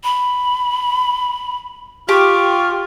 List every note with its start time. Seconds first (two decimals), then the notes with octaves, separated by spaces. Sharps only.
0.04 B5
2.09 F4 G4 C#6